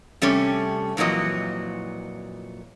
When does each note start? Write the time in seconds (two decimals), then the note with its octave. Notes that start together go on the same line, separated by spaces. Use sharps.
0.22 C3 G3 A3 C#4
0.97 F2 A#2 E3 F#3 D#5